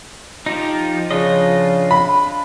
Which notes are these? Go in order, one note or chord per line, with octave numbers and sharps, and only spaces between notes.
F3 D#4 G4
C#3 D4 F4 D#5
B5